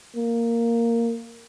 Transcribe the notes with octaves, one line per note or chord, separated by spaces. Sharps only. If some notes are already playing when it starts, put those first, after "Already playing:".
A#3